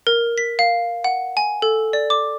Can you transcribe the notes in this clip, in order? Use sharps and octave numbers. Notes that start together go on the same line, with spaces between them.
A#4
B6
F5
F#5
G#5
A4
D5
D6